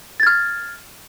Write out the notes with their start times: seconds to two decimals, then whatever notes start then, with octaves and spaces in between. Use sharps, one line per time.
0.20 A6
0.23 G#6
0.27 F6